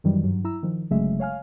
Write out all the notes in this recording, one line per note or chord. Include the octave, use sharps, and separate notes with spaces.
F#2 D#3 E3 F#3 G3
G2 F#3
E4 A#5 E6
D#3 F3
G1 C#3 F#3 G#3 A3 E5
C#5 F5 G#5 F6